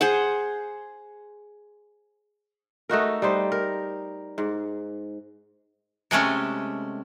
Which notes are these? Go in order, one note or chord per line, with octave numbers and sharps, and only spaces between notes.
G#4 C5 F#5
A3 D#4 F#4 A#4
G3 D#4 C5
A#4
G#2
C3 G#3 A3 C#4